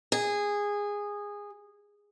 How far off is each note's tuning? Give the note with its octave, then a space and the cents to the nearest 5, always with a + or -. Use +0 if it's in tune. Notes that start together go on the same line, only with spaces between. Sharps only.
G#4 -15